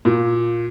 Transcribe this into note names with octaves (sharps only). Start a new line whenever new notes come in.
A#2